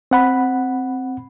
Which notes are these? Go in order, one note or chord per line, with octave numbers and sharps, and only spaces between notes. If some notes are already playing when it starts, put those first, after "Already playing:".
C4 F#5 B5